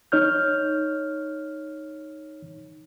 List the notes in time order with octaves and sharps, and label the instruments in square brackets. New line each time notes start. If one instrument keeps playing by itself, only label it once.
[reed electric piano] D#4 C#5 F6 G6